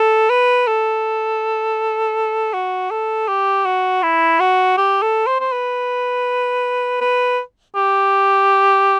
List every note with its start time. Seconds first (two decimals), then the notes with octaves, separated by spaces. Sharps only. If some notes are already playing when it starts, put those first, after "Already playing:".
Already playing: A4
0.30 B4
0.67 A4
2.54 F#4
2.91 A4
3.28 G4
3.65 F#4
4.03 E4
4.40 F#4
4.77 G4
5.02 A4
5.27 C5
5.40 C5
5.52 B4
7.01 B4
7.76 G4